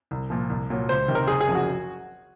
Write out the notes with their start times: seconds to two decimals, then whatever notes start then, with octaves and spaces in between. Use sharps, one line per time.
0.11 C2
0.30 A#2 F3
0.50 C2
0.70 A#2 F#3
0.89 C#2 C5
1.08 C3 D#3
1.15 A#4
1.27 F#1 G#4
1.41 G#4
1.47 F#2 F3
1.55 F#4